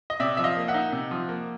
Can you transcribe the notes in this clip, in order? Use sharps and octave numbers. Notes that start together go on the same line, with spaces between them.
D#5
C3 D5 E5
F3 E5
D#5 F5
A#3
E5 F#5
D#4
C3
F3
A#3